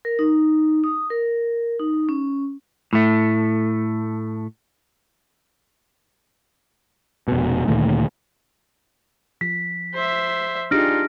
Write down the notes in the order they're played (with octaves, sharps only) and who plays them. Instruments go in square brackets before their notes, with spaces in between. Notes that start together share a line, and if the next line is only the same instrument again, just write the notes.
[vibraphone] A#4
D#4
D#6
A#4
D#4
C#4
[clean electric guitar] A2 A3
[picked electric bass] F1 B2
D2 A#2 D#3 A3
[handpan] F3 [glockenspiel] B6
[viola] C5 E5
[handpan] D4 G4 G#4 [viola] D#4 F4 [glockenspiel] F6 A#6 D7